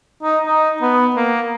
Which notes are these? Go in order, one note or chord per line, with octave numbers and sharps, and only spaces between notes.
D#4
D#4
B3
A#3